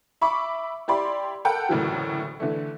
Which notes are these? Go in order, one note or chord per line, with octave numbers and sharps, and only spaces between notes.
E5 B5 C#6 D6
E4 G4 D5 B5 C6
A4 A#4 F#5 G5 A5
F#1 D2 A2 E3 F#3
D3 E3 A3